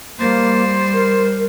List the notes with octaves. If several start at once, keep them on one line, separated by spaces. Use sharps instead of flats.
G3 A#3 C5
A#4